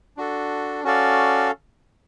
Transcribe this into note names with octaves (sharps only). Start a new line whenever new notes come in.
D4 F#4 A4
C#4 F#4 A4 D5 F5